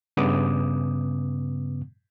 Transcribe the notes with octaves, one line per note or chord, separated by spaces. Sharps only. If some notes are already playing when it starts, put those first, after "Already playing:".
G2 C#3 B3 D6 D#6